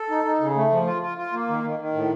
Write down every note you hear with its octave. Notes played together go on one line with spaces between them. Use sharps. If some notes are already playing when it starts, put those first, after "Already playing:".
Already playing: A4
D#4
D#4
C#3
A3
F3
F4
F4
F4
A#3
D#3
D#3
D#3
A2